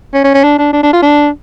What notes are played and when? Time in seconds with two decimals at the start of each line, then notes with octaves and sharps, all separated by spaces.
0.14 C#4
0.24 C#4
0.34 C#4
0.44 D4
0.58 D4
0.73 D4
0.83 D4
0.93 F4
1.02 D4